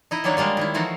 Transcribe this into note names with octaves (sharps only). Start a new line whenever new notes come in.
D#4 E4 D#5
D#3 F#3 A#3 D4 C#5
G3 G#3 A#3 F4
D#3 G#3 E4
E3 F3 A3 D#4 F4 F#4